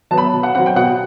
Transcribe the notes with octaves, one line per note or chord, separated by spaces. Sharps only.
F#3 B3 A5
B5
B2
F#5
F#3 C4 F#5
G5
B2 F#5